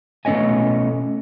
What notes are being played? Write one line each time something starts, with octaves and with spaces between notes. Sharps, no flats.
B2 A3 C#4 C#5 D#5 G#5